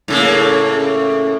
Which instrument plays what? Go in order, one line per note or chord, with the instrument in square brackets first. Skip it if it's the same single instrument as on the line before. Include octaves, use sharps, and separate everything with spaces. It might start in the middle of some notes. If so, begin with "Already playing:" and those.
[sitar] A2 C#3 A#3